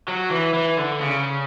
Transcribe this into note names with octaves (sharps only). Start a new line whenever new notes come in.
F#3
E3
E3
D3
C#3